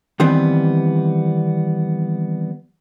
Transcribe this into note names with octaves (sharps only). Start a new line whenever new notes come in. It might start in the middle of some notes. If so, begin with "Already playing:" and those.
D#3 E3 G3 B3 C4